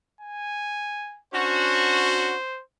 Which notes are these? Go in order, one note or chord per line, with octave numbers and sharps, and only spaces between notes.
G#5
C#4 D4 F#4 C5